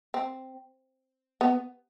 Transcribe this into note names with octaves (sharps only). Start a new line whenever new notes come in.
C4
B3